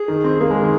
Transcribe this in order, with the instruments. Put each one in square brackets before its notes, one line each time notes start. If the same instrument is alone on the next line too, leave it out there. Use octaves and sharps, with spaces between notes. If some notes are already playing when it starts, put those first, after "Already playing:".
Already playing: [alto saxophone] G#4
[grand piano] D#3
C4
[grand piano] A#3 [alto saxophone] G#4
[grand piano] G#3
D#3